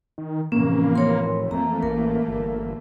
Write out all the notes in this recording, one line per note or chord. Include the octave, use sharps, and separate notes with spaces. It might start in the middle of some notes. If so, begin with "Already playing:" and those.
D#3
F1 A2 E3 A#3 C#4
A#4 C#5 C6
F2 E3 A3 A#3 A#5
A1 A#4
G1